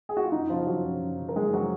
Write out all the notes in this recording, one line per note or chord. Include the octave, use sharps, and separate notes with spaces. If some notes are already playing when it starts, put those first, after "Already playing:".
G#4
F#4
F4
F#2 D#4
C#3 F3 F4
F#2 F#3 F#4
C#3 F3
F#2
C#3 F3
A#4
F#2 G#3 G#4
C#3 F3 F#3 F#4